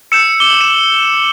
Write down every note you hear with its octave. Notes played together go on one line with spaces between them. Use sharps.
E6 G6 C#7 E7
D6 G7
F#7
E7